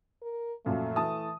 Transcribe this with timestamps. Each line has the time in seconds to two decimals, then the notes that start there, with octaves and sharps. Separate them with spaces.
0.22 A#4
0.66 F#2 A#2 F3 A3
0.96 E3 A5 D#6